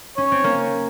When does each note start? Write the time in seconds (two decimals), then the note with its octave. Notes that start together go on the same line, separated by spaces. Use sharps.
0.17 C#4 C#5
0.32 C4
0.44 A#3 C#4